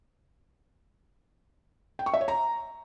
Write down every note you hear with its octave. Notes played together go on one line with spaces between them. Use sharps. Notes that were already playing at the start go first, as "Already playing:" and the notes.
G5
C#6
E5
C#5
A#5